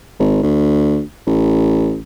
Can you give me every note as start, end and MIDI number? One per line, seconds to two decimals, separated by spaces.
0.19 0.39 32
0.43 1.02 38
1.27 1.99 33